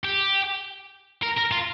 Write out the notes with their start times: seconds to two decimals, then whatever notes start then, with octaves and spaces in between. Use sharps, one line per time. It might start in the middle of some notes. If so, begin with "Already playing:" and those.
0.03 G4
1.23 A#4
1.38 A#4
1.52 F4